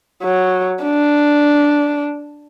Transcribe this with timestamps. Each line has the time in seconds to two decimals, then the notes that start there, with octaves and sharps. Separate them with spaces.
0.23 F#3
0.84 D4